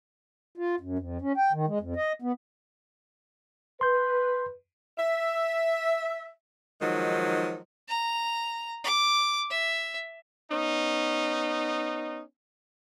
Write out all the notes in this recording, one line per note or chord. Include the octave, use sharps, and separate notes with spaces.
F4
F#2
F2
C#4
G5
D#3
G#3
F2
D#5
B3
B4 C6 G6
E5
D#3 F3 F#3 G#3 D#4
A#5
D6
E5
B3 C#4 D#4